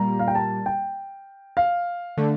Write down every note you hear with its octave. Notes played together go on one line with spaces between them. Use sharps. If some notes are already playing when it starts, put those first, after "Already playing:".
Already playing: A#2 G3 A#3 A#5
F5
G5
A5
G5
F5
D3 A3